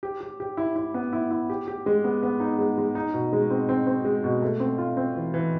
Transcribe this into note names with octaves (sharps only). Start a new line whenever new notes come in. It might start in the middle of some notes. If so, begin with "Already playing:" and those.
G4
G4
G4
E4
E4
B3
E4
E4
G4
G4
G#3
B3
B3
D#4
G#3
G#3
D#4
B2
G#3
C4
C4
C4
G#3
B2
A3
C4
F4
C4
E3
E3